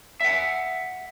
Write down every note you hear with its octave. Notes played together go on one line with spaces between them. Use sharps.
E5 F#5